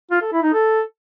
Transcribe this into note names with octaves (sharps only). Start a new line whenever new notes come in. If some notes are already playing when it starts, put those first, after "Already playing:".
F4
A4
E4
D#4
A4